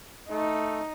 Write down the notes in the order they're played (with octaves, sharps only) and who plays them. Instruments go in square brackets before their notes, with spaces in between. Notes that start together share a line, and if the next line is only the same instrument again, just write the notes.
[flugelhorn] A3 [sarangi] D#4